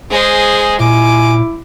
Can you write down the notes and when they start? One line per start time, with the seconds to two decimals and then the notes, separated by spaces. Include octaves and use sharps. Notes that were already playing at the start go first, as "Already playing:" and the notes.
0.11 G#3 G#4 C5
0.80 A#2 E4 G#5 D6